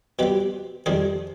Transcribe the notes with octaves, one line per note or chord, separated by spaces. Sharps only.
B2 G3 C4 G4 B4
F2 D#3 G3 D4 G#4 C5